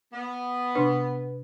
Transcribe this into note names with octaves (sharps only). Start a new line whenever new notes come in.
B3
C3 D4 B4